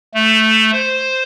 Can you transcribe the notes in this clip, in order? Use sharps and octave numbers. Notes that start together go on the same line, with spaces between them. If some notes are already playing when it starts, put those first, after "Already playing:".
A3
C5